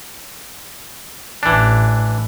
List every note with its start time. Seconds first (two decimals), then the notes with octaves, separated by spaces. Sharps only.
1.43 A1 E3 D4